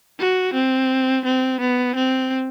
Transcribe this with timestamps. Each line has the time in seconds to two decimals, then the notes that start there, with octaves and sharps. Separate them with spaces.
0.19 F#4
0.54 C4
1.25 C4
1.61 B3
1.96 C4